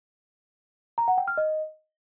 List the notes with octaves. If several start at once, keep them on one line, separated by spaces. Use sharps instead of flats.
A#5
F#5
G5
F6
D#5